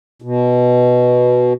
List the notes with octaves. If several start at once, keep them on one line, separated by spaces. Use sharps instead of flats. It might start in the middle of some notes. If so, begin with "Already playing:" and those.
B2